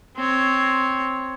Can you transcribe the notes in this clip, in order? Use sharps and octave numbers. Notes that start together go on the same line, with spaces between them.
C4 C#5